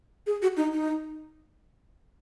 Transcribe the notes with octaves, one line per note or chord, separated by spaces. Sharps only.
G#4
F#4
D#4
D#4